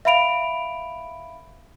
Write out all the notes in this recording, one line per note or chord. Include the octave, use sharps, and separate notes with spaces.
E5 F5 B5 D7 F7